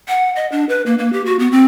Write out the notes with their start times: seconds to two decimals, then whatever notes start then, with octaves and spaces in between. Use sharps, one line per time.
0.08 F#5
0.36 D#5
0.52 D4
0.69 B4
0.86 A#3
0.99 A#3
1.13 G4
1.25 F#4
1.39 B3
1.52 C4